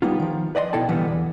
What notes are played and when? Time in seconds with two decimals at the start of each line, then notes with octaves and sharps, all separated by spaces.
0.02 G3 A#3 B3 D#4 F4
0.20 D#3 F3
0.55 B4 D5 D#5 G#5 C6
0.73 B2 E4 A4 G5 A5
0.88 A#2 D3 E3 F3 G3 B3
1.08 E2